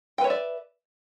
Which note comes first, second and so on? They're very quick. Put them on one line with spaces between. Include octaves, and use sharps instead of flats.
G5 B4 C#5 E5 D5